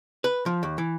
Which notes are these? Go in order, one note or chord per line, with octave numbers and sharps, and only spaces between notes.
B4
F3
D#2
E3